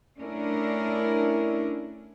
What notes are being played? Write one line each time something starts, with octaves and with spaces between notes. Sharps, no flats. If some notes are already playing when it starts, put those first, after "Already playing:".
A3 C#4 D4 E4 A#4